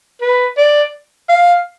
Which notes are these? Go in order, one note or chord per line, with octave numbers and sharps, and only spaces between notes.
B4
D5
F5